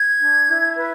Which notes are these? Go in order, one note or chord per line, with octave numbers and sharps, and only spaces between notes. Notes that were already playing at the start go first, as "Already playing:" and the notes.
Already playing: G#6
D4
E4
B4